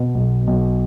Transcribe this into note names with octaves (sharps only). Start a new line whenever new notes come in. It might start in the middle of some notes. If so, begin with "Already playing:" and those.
Already playing: B2
B1
B1